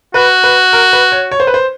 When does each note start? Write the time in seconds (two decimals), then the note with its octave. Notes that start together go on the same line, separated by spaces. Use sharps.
0.14 F#4 B4
0.44 B4
0.73 A#4
0.93 B4
1.12 C#5
1.32 C#5
1.40 C5
1.47 B4
1.54 C5